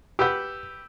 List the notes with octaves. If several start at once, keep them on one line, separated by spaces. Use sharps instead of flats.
G4 B4 F#5 E6 G6